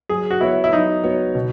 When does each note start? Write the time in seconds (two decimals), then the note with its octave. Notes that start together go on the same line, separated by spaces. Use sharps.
0.09 F#3 G#4
0.30 F#4
0.41 B3 E4 F#4 C#5
0.64 E4
0.72 F#3 D#4
1.04 B3 F#4 C#5
1.35 B2